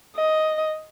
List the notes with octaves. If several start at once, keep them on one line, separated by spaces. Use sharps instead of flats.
D#5